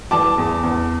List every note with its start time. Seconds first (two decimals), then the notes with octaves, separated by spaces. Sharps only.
0.11 E3 A5 D6
0.38 E2
0.63 E2